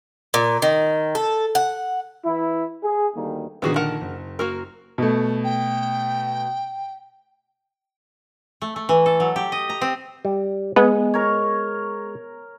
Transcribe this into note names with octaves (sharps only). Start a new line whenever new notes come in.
A#2
D#3
A4
F#5
E3 E4
G#4
D2 D#3 G3 A3 A#3
A#1 D3 D#3 B3 F#4 G#4
A#4 F#5 A5
F#1
A#3 F#4 A#4
B2 A3
G5
A3
A3
E3
A4
F#3
G4
D#5
A#5
C4
G3
G#3 B3
A#4 C#5